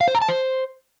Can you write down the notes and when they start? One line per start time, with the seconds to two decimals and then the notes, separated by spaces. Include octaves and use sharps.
0.01 F5
0.08 C5
0.15 A#5
0.22 A5
0.29 C5